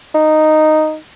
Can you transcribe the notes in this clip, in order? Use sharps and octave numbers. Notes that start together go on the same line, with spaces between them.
D#4